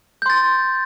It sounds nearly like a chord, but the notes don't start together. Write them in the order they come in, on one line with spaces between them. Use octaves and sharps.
G6 C6 A6